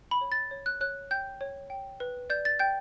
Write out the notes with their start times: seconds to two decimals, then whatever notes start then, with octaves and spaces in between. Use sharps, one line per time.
0.11 B5
0.21 C#5
0.32 A6
0.51 C#5
0.66 F#6
0.81 C#5 F#6
1.11 G5 G6
1.41 C#5
1.70 G5
2.00 B4
2.30 D5 G6
2.45 A6
2.59 G5 G6